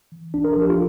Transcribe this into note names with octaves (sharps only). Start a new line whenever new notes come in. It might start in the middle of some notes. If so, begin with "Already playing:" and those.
E3
C2 D4
A#4
F3 A4
G4
F4